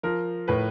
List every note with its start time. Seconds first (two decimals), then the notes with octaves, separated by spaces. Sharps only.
0.03 F3 A#4
0.48 A2 B4